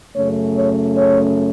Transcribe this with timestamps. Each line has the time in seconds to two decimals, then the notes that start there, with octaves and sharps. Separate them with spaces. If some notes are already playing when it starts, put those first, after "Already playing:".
0.16 F#2 C#3 A3 C#4 C#5
0.56 C#5
0.96 C#5